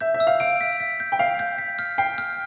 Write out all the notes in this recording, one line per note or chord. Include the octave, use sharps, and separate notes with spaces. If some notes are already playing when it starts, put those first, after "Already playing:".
E5 G6
E5
E6
F5
F5 D7
B6
B6
G6
G5
F5 C7
G6
B6
F6
G5 C7
F6